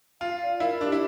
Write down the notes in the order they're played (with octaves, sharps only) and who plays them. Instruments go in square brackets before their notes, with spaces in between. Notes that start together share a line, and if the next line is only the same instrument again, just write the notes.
[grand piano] F4 [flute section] F5
[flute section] D5
[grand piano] E4 [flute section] A#4
[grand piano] D4 [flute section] G4
[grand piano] E4